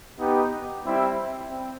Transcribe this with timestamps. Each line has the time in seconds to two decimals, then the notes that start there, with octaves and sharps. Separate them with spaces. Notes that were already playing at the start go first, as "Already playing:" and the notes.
0.18 B3 D#4 G4
0.84 G3 C4 E4
1.48 C4